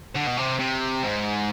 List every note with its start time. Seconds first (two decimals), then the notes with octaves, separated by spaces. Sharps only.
0.15 D3
0.26 B2
0.37 C3
0.59 C3
1.03 G#2